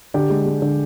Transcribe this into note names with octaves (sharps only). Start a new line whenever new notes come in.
D3 G4
G#3
G#3
D3